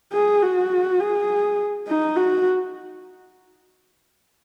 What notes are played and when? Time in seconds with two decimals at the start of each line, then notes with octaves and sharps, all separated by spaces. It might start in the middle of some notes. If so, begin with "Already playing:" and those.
0.12 G#4
0.42 F#4
1.00 G#4
1.87 D#4
2.16 F#4